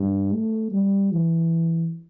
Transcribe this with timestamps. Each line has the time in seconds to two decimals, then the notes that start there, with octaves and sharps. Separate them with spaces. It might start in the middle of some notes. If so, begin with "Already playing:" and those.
Already playing: G2
0.33 A3
0.72 G3
1.12 E3